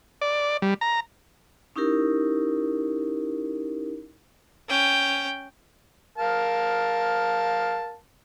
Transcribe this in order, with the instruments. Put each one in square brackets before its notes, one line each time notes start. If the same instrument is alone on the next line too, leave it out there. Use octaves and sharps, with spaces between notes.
[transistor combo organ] D5
G3
A#5
[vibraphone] C#4 D#4 E4 G4 A#4
[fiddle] C#4 G5
[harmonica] A#4 F5 A5